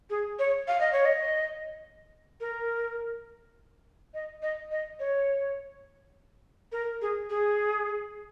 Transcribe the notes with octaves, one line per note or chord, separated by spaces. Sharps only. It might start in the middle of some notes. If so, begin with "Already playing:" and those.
G#4
C#5
F5
D#5
C#5
D#5
A#4
D#5
D#5
D#5
C#5
A#4
G#4
G#4